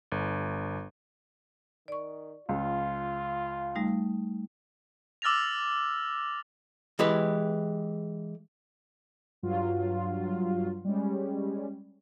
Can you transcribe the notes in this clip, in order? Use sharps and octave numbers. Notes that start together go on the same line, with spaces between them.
G1
D#3 D5 C#6
C#2 F4
G3 A3 D#4
D6 E6 F6 A6 A#6 F7
E3 G#3 G4 B4
G2 F#3 F4
G3 G#3 C#4